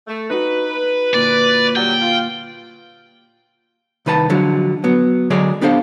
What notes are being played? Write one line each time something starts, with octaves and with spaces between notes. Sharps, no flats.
A3
D#4 F#4 B4
A#2 D3 D5
F#3 G3 G5
F4
C2 D#3 B4 C5 A5
D3 F3 F#3 G#3
F#3 B3
D3 F#3 G#3 G#4 C#5 D5
B3 D4 G4 A4 C5 F5